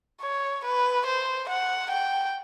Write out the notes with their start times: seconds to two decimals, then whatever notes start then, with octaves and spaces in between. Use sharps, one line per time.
0.21 C#5
0.64 B4
1.06 C5
1.49 F#5
1.91 G5